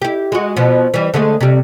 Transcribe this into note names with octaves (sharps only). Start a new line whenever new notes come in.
E4 G4
G#3 F#4
B2 F3
E3 G3
D3 G#3 A3
C3 G3